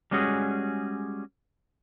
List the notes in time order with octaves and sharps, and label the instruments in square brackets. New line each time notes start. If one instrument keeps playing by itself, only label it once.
[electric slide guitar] G3 G#3 C#4 F#4 G#4